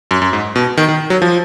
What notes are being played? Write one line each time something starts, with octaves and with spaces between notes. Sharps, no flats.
F#2
F#2
G#2
B2
D#3
D#3
F#3
F3